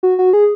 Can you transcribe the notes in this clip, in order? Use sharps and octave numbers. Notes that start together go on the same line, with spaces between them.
F#4
F#4
G#4